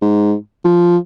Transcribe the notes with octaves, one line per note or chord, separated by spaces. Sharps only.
G#2
F3